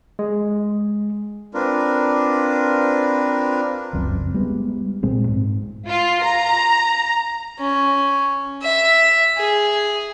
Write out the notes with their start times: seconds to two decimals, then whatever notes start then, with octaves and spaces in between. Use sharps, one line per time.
0.19 G#3
1.54 C4 D4 F4 A#4 B4
3.93 F1 C#2 F#2 C4
4.34 G3 G#3 B3
5.03 B1 A#2 G#3 C4
5.28 G#2
5.87 F4
6.23 A#5
7.59 C#4
8.62 E5
9.38 G#4